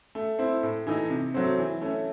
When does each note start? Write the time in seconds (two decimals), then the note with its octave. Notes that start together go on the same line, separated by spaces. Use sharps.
0.15 A3
0.39 C4 E4
0.63 A2
0.87 E3 A3 D#4
1.10 C3
1.34 F#3 A3 C4
1.58 E3
1.81 A3 C#4